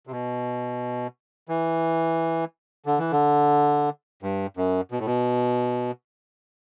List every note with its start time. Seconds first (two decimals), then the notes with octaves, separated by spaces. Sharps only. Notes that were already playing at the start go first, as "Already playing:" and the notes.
0.07 C3
0.11 B2
1.49 E3
2.86 D3
2.99 E3
3.12 D3
4.23 G2
4.57 F#2
4.91 B2
4.99 A2
5.06 B2